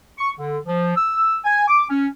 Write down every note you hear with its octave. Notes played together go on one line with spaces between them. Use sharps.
C#6
D3
F3
E6
G#5
D6
C#4